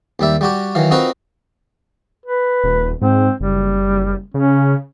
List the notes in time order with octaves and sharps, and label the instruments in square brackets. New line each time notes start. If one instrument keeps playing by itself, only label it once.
[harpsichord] D#2 G3 E5
G3 F#4 G4
D#3 E3 F#3 F5
C4 D#4 F4 F#4 A#4 B4
[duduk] B4
[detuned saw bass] D#1
[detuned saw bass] G#2 [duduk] C4
[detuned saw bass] F#1 [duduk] G3
[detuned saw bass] C#3 [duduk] C#4